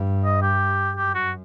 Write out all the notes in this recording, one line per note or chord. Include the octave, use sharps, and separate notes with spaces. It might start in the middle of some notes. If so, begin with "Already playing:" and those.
Already playing: G2
D#5
G4
F#2 G4
F#4